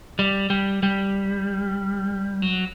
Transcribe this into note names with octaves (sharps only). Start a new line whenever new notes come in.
G3
G3
G3
F#3